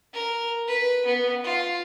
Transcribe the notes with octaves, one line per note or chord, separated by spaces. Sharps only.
A#4
B4
B3
F4